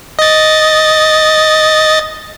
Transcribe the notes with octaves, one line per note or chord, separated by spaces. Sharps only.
D#5 A6